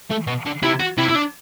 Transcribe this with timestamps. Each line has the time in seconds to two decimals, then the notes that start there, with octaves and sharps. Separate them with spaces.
0.11 A3
0.27 B2
0.45 D3
0.62 C3 E4
0.80 F#4
0.97 C3 E4
1.09 E4
1.15 D4